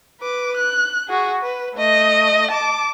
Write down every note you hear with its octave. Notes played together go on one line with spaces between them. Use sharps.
B4 D6
F#6
F#4 G#4
B4
A3 D#5
A5 D6